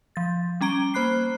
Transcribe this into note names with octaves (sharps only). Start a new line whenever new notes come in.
F3 A6
G3 C#4 A#5 D7 G7
A#3 C5 B5 F#6 C7